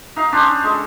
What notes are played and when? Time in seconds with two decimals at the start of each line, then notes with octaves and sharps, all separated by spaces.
0.16 D#4 F5
0.32 C#4 D4 C5 C#5
0.63 G#3 A4